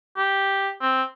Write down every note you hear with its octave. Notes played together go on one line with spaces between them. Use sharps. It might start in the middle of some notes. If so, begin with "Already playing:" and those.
G4
C4